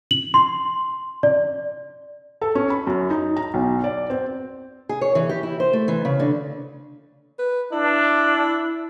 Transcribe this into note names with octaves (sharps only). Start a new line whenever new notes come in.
F#7
C6
D5
A4
C#4
B5
F#2
D#4
A#5
B1
D5
C4
G#4
C#5
E3
G4
E4
C5
A3
E3
C#3
D3
B4
D4 E4